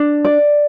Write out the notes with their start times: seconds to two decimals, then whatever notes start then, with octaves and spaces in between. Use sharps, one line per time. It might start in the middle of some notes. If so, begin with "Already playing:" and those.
Already playing: D4
0.25 D5